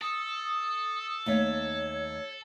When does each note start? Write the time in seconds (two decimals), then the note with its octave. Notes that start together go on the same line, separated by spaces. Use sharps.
0.01 A4 D#6
1.26 D#2 A3 C#5 E5